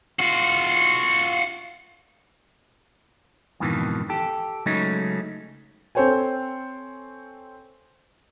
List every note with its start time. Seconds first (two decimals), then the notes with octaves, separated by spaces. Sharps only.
0.19 F4 F#4
3.60 F2 G#2 B2 D#3 E3
4.10 G4 A4
4.66 C#3 F#3 G#3 A3 C#4 D#4
5.95 C4 A4 C5 C#5 G5 G#5